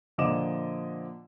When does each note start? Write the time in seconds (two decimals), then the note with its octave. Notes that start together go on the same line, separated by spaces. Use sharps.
0.18 A#2 D3 F3 D#5 D6 E7